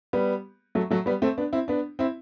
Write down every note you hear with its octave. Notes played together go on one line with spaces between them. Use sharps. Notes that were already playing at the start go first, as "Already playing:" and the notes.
G3 B3
F#3 A3
F#3 A3
G3 B3
A3 C4
B3 D4
C4 E4
B3 D4
C4 E4